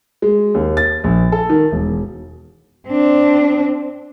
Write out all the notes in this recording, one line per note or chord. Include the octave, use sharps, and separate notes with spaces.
G#3
D#2
A6
A#1
A4
D#3
E1
C4 D4